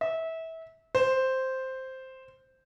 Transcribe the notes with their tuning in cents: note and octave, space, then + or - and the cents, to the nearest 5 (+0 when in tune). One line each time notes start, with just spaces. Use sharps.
E5 -25
C5 +0